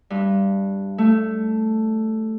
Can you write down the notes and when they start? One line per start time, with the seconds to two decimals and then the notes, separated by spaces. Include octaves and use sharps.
0.10 G2
0.98 A3